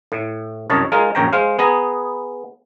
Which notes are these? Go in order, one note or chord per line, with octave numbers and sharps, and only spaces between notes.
A2
C2 F#2 C#5 D#5 A5
G#3 D#4 F4 G#4 A#4
A#1 F#2 C#5 G5 A#5
G#3 C5 F5
B3 G#4 A#5